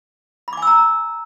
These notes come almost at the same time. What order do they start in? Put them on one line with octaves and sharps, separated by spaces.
B5 D6 G#5 E6 A#5